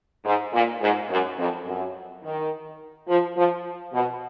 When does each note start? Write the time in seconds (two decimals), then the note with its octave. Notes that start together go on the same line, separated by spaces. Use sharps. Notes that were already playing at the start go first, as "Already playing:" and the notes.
0.25 G#2
0.53 A#2
0.81 G#2
1.09 F#2
1.38 F2
1.66 F#2
2.23 D#3
3.08 F3
3.37 F3
3.93 B2